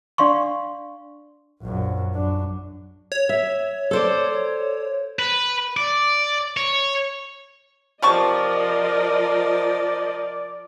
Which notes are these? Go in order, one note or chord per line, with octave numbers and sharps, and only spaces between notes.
D4 D5 F5 C6 C#6
A#1 F#2
F#2 D4
C#5
E5
A4 C5 D5
B4
D5
C#5
C3 F3 A#4 D5 D#5 A5 C#6